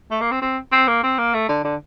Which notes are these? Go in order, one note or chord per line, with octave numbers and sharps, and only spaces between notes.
A3
A#3
C4
C4
C4
A#3
C4
A#3
A3
D3
D3